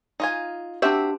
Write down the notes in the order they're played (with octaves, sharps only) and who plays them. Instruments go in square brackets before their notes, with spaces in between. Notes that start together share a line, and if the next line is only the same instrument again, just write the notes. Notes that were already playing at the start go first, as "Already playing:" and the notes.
[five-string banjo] D#4 F4 G#5
[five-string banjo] C4 F#4 E5 [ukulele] D4 G4